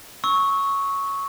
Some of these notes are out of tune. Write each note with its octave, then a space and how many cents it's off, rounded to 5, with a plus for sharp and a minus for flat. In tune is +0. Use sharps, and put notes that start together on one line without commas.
C#6 +0 E6 -25